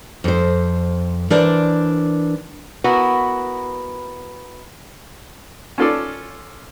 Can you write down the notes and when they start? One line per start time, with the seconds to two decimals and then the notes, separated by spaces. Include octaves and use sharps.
0.24 F2 C5
1.30 E3 D4 A#4 C5 D5
2.84 B3 E4 F#4 A#4 B4
5.78 C#4 F4 A4 D5